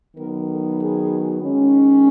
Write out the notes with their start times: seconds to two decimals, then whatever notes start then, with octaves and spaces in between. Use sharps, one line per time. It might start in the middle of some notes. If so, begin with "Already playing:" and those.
0.16 D#3 F#3 B3 A#4
0.49 A4
0.79 G#4
1.41 D#3 G#3 C#4